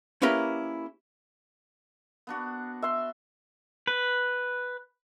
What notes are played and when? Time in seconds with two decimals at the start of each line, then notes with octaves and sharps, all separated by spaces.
0.22 A#3 C#4 E4 G4 A#4 B4
2.27 B3 D4 F#4
2.82 E5 C6
3.87 B4